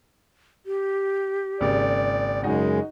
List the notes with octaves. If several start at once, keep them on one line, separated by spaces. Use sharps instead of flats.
G4
G#1 C#3 A#3 D5
F#2 C#3 G#3 D#4 F#4 D#5 G#5